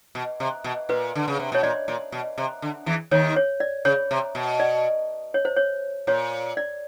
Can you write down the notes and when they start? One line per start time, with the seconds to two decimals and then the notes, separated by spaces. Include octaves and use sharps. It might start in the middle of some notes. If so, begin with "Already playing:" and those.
0.15 B2
0.40 C3
0.64 B2
0.89 A#2 B4
1.15 D3
1.28 C#3
1.39 C3
1.52 B2 C#5
1.63 A#2 D5
1.88 A#2
2.12 B2
2.38 C3
2.62 D3
2.86 E2 E3
3.11 D#2 D#3 C#5
3.36 C#5
3.60 D5
3.85 C#3 C#5
4.11 C3
4.35 B2
4.60 D5
5.34 C#5
5.45 C5
5.56 C#5
6.07 A#2 C#5
6.57 D5